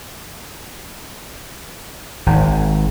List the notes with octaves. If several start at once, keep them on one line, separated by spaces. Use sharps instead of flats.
G#1